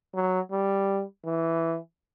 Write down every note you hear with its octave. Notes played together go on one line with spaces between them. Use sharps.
F#3
G3
E3